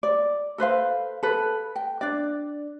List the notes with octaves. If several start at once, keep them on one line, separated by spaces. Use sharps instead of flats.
D5
A4 B4 C5 F5
A4 B4
G5
D4 D5